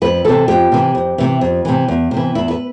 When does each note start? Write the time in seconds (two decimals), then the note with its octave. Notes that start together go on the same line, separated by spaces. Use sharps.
0.02 F2 B4
0.25 C3 E3 A4
0.48 F2 G4
0.72 C3 E3
0.95 F2
1.18 C3 E3
1.41 F2
1.65 C3 E3
1.88 E2
2.11 C3
2.17 E3
2.35 E2 E4
2.50 B4